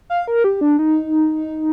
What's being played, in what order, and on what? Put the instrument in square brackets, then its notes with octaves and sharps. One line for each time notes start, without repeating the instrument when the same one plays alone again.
[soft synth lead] F5
A#4
G4
D4
D#4